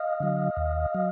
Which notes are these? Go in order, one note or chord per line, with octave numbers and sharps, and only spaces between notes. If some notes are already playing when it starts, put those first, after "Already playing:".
Already playing: D#5 F5
D3 F#3
D#2
F#3